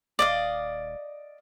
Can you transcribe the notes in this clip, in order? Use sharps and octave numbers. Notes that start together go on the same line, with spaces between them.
D#1 D5 D#5 F5